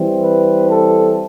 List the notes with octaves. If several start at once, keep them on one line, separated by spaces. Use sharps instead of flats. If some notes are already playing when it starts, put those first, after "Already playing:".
Already playing: E3 G3 C4
B4
A4